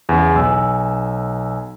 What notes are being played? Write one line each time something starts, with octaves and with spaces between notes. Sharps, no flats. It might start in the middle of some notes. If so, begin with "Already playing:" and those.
E2 C#3
B1 G#5 E6